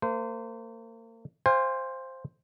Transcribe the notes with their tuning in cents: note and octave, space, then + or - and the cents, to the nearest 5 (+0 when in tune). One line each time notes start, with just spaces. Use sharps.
A#3 -40 C5 -25
C5 +5 F5 +0 G#5 -45